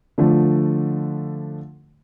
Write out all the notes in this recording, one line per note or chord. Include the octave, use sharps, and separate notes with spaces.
D3 F3 A3